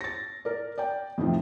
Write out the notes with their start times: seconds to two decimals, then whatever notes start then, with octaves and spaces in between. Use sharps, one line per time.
0.01 A6 A#6
0.45 A#4 D5
0.78 D5 G5
1.18 F2 A2 C3 D#3 F3